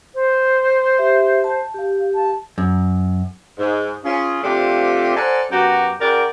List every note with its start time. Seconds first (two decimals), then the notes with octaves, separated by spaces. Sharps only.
0.15 C5
0.98 G4 E5
1.44 A5
1.74 G4 F5
2.15 A5
2.58 F#2
3.59 G#2
4.04 C#4 F4 G#4
4.43 C3 F3 A3 D4 F4 G4
5.16 A4 C5 D5 F#5 G#5 A#5
5.51 F#2 B3 F#4 G4 A#5
6.00 C#3 F#4 A#4 D5 G5 A#5